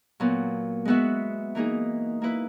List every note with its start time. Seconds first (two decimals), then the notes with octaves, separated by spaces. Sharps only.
0.20 A#2 F#3 B3
0.85 G#3 B3 F#4 B4 E5
1.55 E3 A#3 D#4 G#4
2.22 A#3 E4 B4